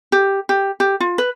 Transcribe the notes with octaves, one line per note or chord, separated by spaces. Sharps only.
G4
G4
G4
F4
B4